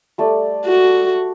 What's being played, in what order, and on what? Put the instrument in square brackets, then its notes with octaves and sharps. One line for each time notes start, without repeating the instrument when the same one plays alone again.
[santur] G3 A3 D5
[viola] F#4